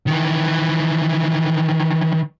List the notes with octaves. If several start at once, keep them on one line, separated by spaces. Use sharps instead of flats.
D#3 E3